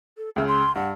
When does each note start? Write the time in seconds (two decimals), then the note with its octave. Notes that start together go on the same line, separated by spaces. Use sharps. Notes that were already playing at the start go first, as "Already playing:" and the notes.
0.17 A4
0.36 C#2 C#3 E5
0.48 C6
0.76 G2 F#5